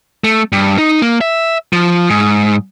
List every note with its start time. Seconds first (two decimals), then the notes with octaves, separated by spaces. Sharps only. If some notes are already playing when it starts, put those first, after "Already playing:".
0.24 A3
0.52 G2
0.78 D#4
1.02 A#3
1.21 E5
1.73 F3
2.10 G#2